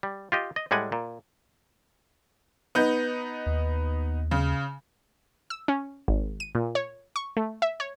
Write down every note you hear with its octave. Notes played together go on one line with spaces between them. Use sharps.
G3
F4 G4 D#5
D#5
A2 G3 G#3 F#5 G#5
A#2
B3 D#4 G6
D#2
C#3
E6
C#4
G#1
D#7
A#2
C#5
C#6
A3
E5
C#5